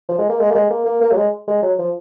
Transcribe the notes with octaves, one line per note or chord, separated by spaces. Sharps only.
F3
G#3
A#3
G#3
A#3
G#3
A#3
A#3
A#3
F#3
G#3
G#3
F#3
F3